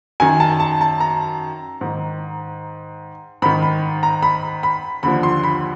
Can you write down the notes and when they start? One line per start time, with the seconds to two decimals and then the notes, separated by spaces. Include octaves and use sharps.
0.20 F#2 D#3 G#5
0.40 A5
0.60 A5
0.81 A5
1.00 A#5
1.81 G#2 D#3
3.42 G#2 D#3 B5
3.62 B5
4.03 A#5
4.23 B5
4.63 B5
5.03 D#2 D3 F3 B5
5.23 C6
5.43 B5